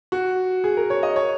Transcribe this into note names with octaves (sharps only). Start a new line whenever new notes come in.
F#4
G#4
A#4
C#5
D#5
C#5